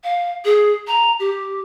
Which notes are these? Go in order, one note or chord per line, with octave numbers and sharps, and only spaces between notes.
F5
G#4
A#5
G4